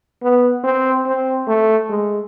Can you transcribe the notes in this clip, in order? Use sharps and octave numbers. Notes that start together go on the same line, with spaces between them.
B3
C4
C4
A3
G#3